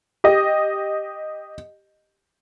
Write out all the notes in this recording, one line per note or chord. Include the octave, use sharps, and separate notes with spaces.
G4 D#5